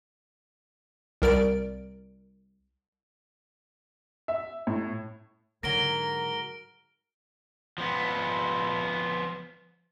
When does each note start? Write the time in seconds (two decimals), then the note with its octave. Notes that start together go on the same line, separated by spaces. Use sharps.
1.22 C2 A#4 D5 D7
4.28 E5
4.67 A2
5.63 G#2 D3 F#3 A#4 G#5 A#6 D7 G7
7.78 F3 B3